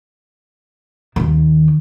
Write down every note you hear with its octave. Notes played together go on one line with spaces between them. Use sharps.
D#2 D#3